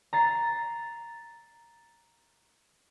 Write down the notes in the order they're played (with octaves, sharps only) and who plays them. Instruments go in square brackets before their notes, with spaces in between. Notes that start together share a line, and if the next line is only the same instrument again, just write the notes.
[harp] A#5 A6 C7